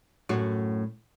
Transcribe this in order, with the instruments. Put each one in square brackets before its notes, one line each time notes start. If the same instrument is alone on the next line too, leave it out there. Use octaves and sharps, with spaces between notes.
[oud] F#2 A2 F#4